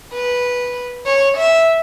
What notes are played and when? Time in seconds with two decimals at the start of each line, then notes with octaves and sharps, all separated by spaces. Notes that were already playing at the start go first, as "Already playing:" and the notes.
0.13 B4
1.06 C#5
1.37 E5